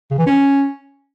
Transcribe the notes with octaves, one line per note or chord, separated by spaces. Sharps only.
C#3
E3
C#4